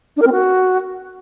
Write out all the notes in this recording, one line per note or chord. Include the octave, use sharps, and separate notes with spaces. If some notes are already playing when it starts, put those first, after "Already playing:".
D4
A#4
C4
F#4